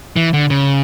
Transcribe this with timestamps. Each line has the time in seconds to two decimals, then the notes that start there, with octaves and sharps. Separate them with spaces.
0.16 E3
0.33 D3
0.50 C#3